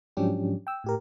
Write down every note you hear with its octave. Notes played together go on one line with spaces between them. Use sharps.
G#2 F3 F#3 C#4 D4 G4
G5 E6
A2 G4 A#4